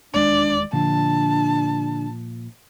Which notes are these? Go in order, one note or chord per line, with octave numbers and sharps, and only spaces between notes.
E1 D#2 G#3 D4 D5
A#2 D3 F3 D4 A5